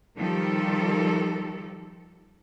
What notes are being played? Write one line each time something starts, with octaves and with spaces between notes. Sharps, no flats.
D#3 F3 G3 G4 A4 A#4